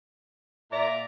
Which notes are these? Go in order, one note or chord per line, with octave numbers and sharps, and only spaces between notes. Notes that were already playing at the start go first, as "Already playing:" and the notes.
A#2 D5 E5 A#5